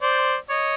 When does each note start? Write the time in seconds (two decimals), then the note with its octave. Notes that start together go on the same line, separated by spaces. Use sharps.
0.02 C5 D5
0.50 C#5 D#5